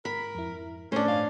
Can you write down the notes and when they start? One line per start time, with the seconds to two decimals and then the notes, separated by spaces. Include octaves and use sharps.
0.05 G#2 A#4 B5
0.35 F2 E4
0.92 A2 A3 C#4 D4 C5
1.08 G2 D#5 F5